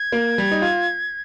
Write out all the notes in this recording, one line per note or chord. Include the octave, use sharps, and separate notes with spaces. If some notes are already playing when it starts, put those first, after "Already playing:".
Already playing: G#6
A#3
G3
D#4
F4